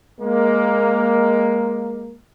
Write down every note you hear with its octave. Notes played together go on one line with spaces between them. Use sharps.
G#3 A#3